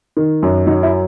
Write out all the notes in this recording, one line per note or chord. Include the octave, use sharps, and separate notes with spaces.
D#3
F#2
F#3 D#4
E4